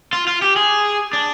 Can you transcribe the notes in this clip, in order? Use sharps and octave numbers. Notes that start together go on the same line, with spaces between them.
F4
F4
G4
G#4
D4